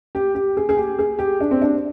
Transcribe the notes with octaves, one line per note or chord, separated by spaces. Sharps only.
G4
G4
G#4
G#4
G4
G#4
G4
D4
C4
D4